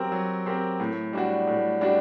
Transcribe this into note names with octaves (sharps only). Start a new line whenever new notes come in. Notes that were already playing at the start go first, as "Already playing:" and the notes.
Already playing: F#3 C4 G4 A#4
F#3
C4 G4 A#4
A2
G3 D4 F#4
A2
G3 D4 F#4